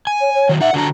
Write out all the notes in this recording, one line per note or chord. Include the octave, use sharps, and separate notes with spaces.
G#5
C#5
C#5
D#3 F#3
D#4 E5 F#5
D3 D4 F#4 A#5